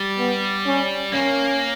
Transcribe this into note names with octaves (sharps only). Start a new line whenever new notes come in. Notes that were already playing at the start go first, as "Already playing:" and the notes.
Already playing: G3
B3
C#4
A#3 C#4